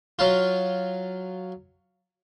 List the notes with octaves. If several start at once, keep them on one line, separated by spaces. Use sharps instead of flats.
F#3 F4